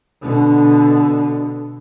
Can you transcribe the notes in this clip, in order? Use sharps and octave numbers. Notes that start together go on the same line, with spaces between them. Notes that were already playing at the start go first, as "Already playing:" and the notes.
B2 D3